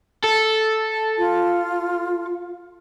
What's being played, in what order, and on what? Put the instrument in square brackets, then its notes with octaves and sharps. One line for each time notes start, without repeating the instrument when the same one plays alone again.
[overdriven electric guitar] A4
[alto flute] F4